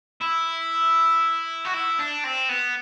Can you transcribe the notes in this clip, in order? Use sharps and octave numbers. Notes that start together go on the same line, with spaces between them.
E4
F#4
E4
D4
C4
B3